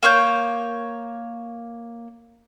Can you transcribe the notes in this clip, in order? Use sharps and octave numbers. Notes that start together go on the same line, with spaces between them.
A#3 C#5 F5 G6